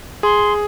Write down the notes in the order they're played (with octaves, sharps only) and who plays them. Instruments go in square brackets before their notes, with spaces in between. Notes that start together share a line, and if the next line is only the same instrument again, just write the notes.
[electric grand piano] G#4 [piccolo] C6